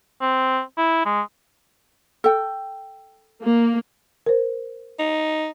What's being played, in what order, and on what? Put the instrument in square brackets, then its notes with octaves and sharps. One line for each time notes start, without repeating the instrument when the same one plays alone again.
[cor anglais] C4
E4
G#3
[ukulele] A4 G5
[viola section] A#3
[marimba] A#4 C5
[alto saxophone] D#4